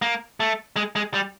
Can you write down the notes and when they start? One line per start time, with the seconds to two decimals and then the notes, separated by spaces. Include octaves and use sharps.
0.02 A#3
0.40 A3
0.76 G#3
0.96 G#3
1.14 G3